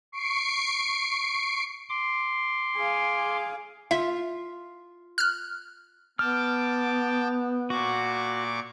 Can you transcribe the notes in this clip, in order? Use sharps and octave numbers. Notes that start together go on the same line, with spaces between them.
C#6 C7 D7
C6 D6
G#4 F5
F4 E5
F6 F#6
B3 G5 A5 D6 F6
A#2 F#4 C#6 D6